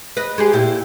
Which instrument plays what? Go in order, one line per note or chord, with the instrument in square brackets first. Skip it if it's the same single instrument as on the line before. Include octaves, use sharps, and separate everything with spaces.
[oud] B4 D#5
G#3 G4 G#4
A#2 E4 G4